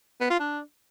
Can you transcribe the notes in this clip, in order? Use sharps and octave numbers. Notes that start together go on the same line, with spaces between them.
B3
F4
D4